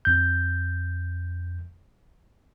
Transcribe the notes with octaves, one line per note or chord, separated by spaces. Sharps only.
F2 G6